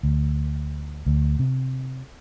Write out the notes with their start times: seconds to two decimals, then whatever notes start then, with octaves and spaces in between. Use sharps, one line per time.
0.03 D2
1.06 D2
1.39 C3